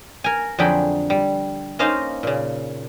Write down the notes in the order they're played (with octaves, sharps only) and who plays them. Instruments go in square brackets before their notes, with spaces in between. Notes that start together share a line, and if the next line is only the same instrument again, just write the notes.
[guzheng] A#4 G#5
F2 D3 F#3 G#4 G5 B5
G3
A#3 C#4 D#4 C5 D#5 F5
A#2 C#3